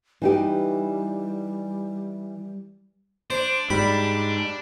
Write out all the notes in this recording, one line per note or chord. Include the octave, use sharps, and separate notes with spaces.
E3 G3 D#4 G4
D4 C5
G#2 G3 B5